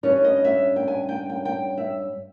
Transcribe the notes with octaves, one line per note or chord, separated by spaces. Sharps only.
G2 G3 C#4 C#5
D#5
E5
G5
G#5
G5
G5
G5
E5